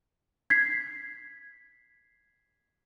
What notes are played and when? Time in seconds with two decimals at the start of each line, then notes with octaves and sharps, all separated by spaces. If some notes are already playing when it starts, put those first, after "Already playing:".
0.50 G#6 B6 C7